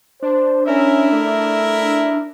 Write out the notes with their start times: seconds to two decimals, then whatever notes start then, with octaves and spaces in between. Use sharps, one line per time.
0.22 D4 C5
0.67 C#4 E4 A#4 E5
1.12 A3